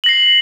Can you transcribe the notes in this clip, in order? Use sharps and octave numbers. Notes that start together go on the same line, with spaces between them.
A#6 C7 F#7